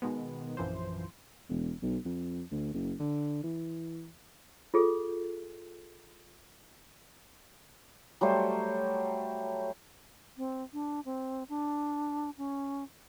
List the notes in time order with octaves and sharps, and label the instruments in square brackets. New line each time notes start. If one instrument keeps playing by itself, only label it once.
[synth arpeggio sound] B2 D#3 G#3 B3
A#1 F#2 E3 F3 C5
[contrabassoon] E1
B1
F2
D2
F#1
D3
E3
[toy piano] F4 G#4 A4
[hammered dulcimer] F#3 G3 A3 C5
[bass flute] C4
D4
C4
D4
C#4